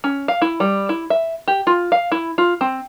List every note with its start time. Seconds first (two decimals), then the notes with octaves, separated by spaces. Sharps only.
0.04 C#4
0.28 F5
0.42 E4
0.60 G3
0.89 E4
1.10 E5
1.48 G4
1.67 F4
1.92 F5
2.12 E4
2.38 F4
2.61 C4